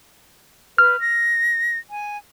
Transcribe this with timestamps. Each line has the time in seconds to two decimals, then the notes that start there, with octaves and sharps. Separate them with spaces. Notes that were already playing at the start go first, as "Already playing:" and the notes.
0.78 B4 F6
1.00 A#6
1.90 G#5